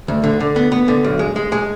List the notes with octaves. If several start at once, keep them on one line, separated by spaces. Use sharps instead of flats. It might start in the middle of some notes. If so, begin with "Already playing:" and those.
D2
D3
D3
B3
B3
D3
B1
G#3
G#3
G#3